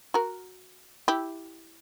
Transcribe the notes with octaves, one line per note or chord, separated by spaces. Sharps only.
F#4 A#4
E4 G4